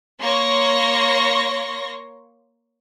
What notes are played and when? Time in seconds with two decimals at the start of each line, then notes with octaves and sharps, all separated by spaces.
0.21 A#3 C#5 C6 C#6 A#6